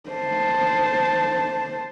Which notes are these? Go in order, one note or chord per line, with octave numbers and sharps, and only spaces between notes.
C5 A5